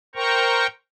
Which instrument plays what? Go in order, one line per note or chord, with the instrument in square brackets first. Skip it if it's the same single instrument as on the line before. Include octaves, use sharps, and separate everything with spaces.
[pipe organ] A#4 C5 G5 A#5 C#6